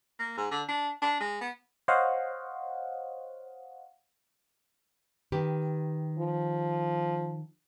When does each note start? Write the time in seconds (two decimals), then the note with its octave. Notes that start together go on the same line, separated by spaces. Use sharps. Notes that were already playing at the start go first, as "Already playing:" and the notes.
0.19 A#3
0.37 G#2
0.51 D3
0.68 D4
1.02 D4
1.21 G#3
1.41 B3
1.88 C5 C#5 D#5 F5 F#5
5.32 D#3 G4 B4
6.19 F3